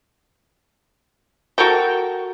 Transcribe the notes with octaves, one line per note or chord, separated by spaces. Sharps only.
F#4 A4 A#4 G5